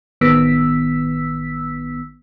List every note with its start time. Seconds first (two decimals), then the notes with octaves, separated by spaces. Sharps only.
0.21 A1 D#3 B3 E6 B6